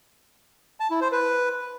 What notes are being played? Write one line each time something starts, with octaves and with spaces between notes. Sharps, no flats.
A5
E4
C5
B4